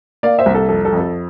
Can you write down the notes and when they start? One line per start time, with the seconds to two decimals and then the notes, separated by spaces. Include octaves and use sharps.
0.23 A#3 D5 F5
0.39 C5 E5
0.46 C2
0.55 A4
0.69 F2 A4
0.85 A4
0.93 F2
1.00 A4